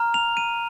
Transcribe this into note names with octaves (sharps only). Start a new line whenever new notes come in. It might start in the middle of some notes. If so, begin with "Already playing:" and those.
Already playing: A#5 F6
F7
D#7